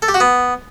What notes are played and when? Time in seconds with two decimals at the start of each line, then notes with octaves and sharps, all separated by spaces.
0.02 A4
0.08 G4
0.14 F#4
0.20 B3